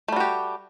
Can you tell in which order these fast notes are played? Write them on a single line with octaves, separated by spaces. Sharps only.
A3 G3 F#4 G4